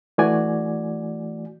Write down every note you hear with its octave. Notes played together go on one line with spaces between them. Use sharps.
E3 A3 F#4 D5 G#5